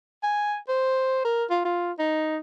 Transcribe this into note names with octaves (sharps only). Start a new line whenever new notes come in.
G#5
C5
A#4
F4
F4
D#4